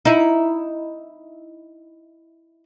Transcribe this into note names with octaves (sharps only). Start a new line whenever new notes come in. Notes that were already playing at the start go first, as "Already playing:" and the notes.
D#4 E4